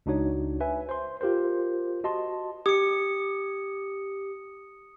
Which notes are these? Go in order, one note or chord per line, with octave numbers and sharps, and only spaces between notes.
C#2 D4 D#4 F#4 C#5
B4 E5 G#5
C5 C6
F4 G4 A#4 C5
F#4 D#5 A5 C6
G4 D#6 C#7